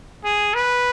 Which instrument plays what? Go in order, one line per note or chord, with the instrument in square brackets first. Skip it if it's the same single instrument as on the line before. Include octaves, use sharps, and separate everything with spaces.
[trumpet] G#4
B4